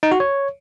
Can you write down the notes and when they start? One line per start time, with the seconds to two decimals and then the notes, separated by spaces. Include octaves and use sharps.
0.03 D#4
0.12 F#4
0.20 C#5